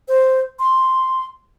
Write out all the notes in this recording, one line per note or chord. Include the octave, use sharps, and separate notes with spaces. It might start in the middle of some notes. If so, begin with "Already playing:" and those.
C5
C6